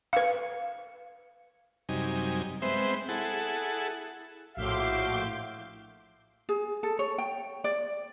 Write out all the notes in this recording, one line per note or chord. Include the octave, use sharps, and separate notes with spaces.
B4 F5
F#2 C3 G3 D#4 G#5
G#3 B3 C4 C5 E5
E4 G#4 A4 F#5
A#1 A2 F#4 E5 F5 C6 D6 G6
G#4
A4
C#5
G5
D5